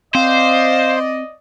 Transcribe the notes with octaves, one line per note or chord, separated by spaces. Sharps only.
C4 C5 D5 D#5 F5